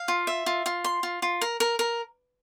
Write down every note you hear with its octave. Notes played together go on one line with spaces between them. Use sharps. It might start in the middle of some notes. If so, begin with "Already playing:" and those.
Already playing: F5
F4
E5
F4
F4
C6
F4
F4
A#4
A#4
A#4